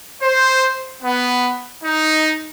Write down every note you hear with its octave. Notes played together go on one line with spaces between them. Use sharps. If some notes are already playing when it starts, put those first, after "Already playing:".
C5
B3
D#4